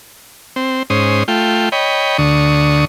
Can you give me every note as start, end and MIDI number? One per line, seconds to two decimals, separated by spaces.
0.56 0.83 60
0.90 1.23 44
0.90 1.23 61
0.90 1.23 72
0.90 1.23 87
1.28 1.69 57
1.28 1.69 65
1.28 1.69 79
1.72 2.17 73
1.72 2.17 75
1.72 2.17 79
1.72 2.17 83
2.18 2.85 38
2.18 2.85 50
2.18 2.85 85
2.18 2.85 87